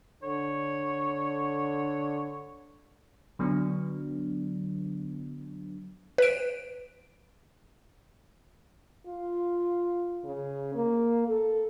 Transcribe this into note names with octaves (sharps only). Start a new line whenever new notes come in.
D3 C#5
D3 F#3 B3 D4
B4 D7
F4
C#3
A#3
A4